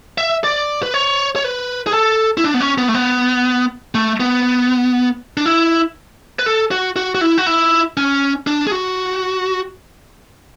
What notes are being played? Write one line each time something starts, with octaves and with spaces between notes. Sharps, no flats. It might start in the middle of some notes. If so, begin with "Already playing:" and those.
E5
D5
B4
C#5
C#5
B4
G#4
A4
E4
D4
B3
C#4
B3
A3
B3
A3
B3
D4
E4
B4
A4
F#4
F#4
F#4
E4
F#4
E4
C#4
D4
G#4
F#4